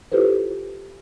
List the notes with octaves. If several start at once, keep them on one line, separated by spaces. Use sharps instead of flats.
E4 F4 G4 A4 B4 C5